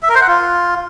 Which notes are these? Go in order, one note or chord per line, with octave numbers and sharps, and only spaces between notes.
E5
A#4
C5
F#5
F4